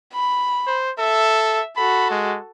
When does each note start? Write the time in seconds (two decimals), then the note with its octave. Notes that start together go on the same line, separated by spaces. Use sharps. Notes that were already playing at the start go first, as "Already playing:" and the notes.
0.13 B5
0.67 C5
0.99 A4 E5
1.77 F#4 A4 B5
2.11 G#3